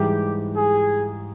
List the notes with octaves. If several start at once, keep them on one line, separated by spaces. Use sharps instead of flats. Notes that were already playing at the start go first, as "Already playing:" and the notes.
Already playing: G#2 E3 G3 G4
G#4